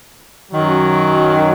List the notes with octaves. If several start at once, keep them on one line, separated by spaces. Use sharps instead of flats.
F#2 D#3 F#3